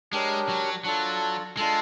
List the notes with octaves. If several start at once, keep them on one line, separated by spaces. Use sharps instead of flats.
G#3 D4 G4 A#4 C#5
F#3
F#3 D4 F4 A4
G#3 D4 F4 A4